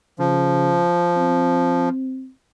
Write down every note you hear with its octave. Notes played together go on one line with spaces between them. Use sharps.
C#3 F3
C4